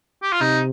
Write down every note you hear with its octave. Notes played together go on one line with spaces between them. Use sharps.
G4
F4
C3 D#4